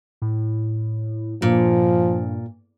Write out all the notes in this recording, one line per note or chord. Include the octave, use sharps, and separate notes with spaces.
A2
G2 A#2 F3